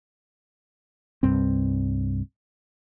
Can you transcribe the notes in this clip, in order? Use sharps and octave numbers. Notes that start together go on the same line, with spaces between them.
C2 G2 C4